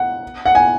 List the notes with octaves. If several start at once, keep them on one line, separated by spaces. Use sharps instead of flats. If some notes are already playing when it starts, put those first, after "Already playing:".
Already playing: F#5
F#5
G#5